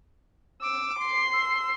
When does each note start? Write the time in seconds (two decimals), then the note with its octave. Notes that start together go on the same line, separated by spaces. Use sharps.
0.62 D6 E6
0.99 C6 C7
1.33 E6